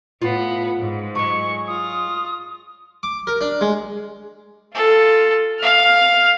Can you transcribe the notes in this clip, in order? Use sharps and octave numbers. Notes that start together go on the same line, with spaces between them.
A2 B3 F4
G#2
F#3 G#3 C#6
F4 D#6
D6
A#4
D4
G#3
F4 A4
F5 F6